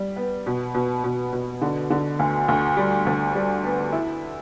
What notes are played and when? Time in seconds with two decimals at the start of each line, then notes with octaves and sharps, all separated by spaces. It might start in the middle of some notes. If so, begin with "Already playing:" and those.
Already playing: G3
0.16 B3
0.47 B2
0.75 B2
1.04 B2
1.33 B2
1.61 D3
1.90 D3
2.19 D2
2.48 D2
2.77 G3
3.07 D2
3.35 G3
3.64 B3
3.92 E4